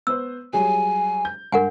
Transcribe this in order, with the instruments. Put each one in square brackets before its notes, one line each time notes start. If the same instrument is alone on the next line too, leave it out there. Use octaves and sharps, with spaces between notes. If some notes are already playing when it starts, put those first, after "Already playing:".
[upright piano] B3 B4 C5 [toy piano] E6
[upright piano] F#3 G3 G#4 [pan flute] G#5
[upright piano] G6
[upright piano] G2 [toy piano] A#4 F#5 G#5